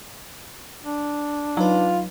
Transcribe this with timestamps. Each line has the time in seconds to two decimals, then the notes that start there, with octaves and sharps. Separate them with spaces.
0.83 D4
1.57 F#3 D#4 F4 B4